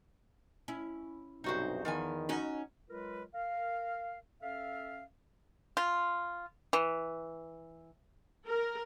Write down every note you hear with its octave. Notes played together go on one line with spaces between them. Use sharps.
C#4 E4
B1 G2 C3 D#4 F#4 C5
E2 D#3 F3 B3 G#5
C#4 D#4 F#4
F#3 G#3 F4 A#4 B4
A#4 F5
C#4 A4 E5 F5
F4
E3
A#4